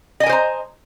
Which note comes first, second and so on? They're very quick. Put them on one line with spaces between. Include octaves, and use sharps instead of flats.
D#5 G#5 A#4 C5 A#5